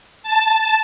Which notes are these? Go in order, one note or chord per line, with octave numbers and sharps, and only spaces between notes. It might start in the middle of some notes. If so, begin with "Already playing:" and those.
A5